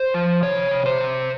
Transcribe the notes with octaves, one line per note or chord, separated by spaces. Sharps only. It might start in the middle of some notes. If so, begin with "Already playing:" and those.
Already playing: C5
F3
C3 C#5
C3
C5
C3